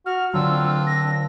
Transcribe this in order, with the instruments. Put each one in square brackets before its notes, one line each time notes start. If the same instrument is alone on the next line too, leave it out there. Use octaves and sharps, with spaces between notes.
[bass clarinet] F#4 [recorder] F6
[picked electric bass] D3 F#3 [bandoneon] C4 D4 [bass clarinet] F4 [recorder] E6
[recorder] A#6